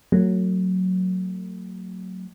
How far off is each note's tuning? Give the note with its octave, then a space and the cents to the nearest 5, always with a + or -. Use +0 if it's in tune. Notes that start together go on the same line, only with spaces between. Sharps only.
F#3 +0 A3 +45